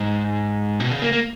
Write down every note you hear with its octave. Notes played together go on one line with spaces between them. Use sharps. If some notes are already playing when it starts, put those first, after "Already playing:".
Already playing: G#2
B2
C#3
A#3
A#3